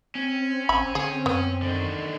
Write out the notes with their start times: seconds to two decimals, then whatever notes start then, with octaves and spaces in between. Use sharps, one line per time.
0.15 C4 C#4
0.69 A1 E5 B5
0.95 D3 G#4 C#5 G#5
1.26 F#2 B3
1.62 D3 D#3